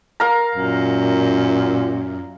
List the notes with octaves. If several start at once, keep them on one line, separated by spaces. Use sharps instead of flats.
A#4 F5 A#5
F#2 A#2